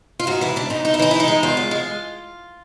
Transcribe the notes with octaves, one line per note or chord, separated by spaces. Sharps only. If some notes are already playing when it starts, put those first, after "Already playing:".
F4
G#2 F#4
E3 E4
E3 D4
G#2 D#4
G#2 D#4
E4
E3 D#4
G#2 E4
D#4
G#3
E2 F4
E2
G#3